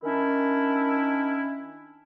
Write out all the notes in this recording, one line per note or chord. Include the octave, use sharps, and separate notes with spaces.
D#3 C#4 D4 E4